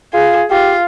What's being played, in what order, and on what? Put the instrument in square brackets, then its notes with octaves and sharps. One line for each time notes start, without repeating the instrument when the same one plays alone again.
[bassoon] F4 [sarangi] G#4
[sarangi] F4 [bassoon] G4